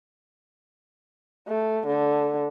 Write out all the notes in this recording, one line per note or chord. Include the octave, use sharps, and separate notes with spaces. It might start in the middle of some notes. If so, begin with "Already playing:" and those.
A3
D3